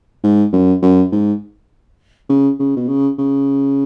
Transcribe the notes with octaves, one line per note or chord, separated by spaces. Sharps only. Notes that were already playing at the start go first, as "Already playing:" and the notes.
G#2
F#2
F#2
G#2
C#3
C#3
B2
C#3
C#3